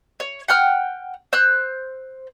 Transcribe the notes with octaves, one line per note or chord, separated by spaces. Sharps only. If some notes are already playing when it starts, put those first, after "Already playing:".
C#5
F#5 G5 F6
C5 E6 F#6